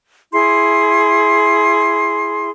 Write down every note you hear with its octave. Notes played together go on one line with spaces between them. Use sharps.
E4 G#4 C6